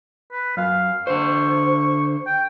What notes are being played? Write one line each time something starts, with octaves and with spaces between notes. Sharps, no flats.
B4
F#2 F5
D3 C5 C#6
G5